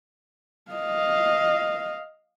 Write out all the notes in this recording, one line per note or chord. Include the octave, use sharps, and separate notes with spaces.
D#5 F5